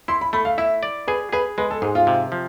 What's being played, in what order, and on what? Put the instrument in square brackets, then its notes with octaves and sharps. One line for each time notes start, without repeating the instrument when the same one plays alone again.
[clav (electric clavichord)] E4 [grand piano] C6
[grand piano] B5
[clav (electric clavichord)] A3 [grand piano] B5
[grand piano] F5
[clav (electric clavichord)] E4 [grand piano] E5
[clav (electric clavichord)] D5
[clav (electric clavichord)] G#4 [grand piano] B4
[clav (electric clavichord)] G#4 [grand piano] B4
[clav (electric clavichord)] G#3 [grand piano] B4
[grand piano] A4
[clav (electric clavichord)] G#2 [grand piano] G#4
[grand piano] F4
[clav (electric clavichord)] C3
F3